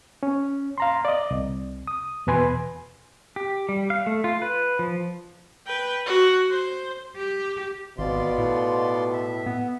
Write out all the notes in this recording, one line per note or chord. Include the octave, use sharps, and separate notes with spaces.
C#4
F5 A#5 C6
D5 D#5
C2
D#6
E2 B2 B4 G#5 C6
G4
G3
F5
A3
F4
B4
F3
B4 G5
F#4
C5
G4
G#1 B2 F4 D5 C6
A2
E5
B3